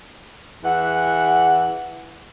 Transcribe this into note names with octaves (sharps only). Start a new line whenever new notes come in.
E2 E3 F#5